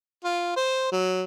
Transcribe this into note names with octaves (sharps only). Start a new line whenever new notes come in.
F4
C5
F#3